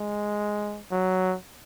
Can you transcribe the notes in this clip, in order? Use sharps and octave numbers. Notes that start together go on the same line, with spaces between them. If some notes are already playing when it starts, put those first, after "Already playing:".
Already playing: G#3
F#3